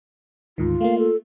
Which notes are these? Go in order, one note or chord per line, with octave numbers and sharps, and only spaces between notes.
D2 G#2 D#3 F4
A3 A#3 F5
A4